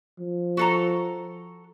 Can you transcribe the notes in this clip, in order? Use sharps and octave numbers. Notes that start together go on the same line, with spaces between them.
F3
F#4 A4 A#5